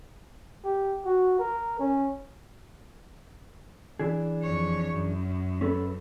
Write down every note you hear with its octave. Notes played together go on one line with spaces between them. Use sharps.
G4
F#4
A#4
C#4
E3 D4 G#4
F2 C#5
F#2
C#4 A4 B4